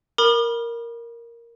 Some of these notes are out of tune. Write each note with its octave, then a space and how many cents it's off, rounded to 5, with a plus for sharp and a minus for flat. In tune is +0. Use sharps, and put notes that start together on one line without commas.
A#4 +0 B5 -30 D6 +45